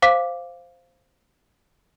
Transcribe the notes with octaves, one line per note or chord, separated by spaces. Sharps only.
C5 F5 D6 B6